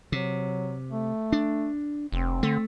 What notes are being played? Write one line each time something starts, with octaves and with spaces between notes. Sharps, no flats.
C3 F#3
A3
D4
F1 C4
D3 A3